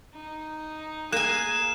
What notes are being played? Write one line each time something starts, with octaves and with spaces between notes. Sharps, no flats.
D#4
A#3 G#4 G#5 F#6 E7